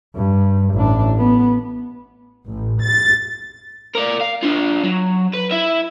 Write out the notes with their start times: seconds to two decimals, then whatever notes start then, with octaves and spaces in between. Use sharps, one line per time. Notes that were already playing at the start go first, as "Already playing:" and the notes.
0.15 G2
0.74 A1 D4
1.17 B3
2.47 A1
2.81 A6
3.95 A#4 D5
4.21 F5
4.43 D4 F4
4.84 F#3
5.34 B4
5.51 E4 E5